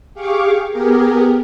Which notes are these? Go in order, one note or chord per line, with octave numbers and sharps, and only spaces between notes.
G4 G#4 F5 C#6 D6
B3 G4 G#4 A#4